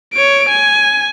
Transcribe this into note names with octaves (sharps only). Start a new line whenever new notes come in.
C#5 D7
G#5